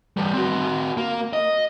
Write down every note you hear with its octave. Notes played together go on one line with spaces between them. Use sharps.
E3 G3
C4 F#4
A#3
D#5